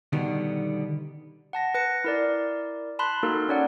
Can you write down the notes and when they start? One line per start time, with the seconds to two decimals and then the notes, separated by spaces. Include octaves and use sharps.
0.13 B2 D3 D#3 G3 B3
1.53 F#5 A5 A#6
1.74 B4 A#6 C#7
2.04 E4 A#4 D5
2.99 A5 B5 C6 F#6
3.23 A#3 D#4 F#4 A4 A#4
3.48 C#4 C#5 D5 F#5